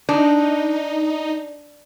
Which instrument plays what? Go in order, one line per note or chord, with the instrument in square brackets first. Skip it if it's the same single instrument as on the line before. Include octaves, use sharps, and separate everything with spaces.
[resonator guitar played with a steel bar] D4 [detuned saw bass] D#4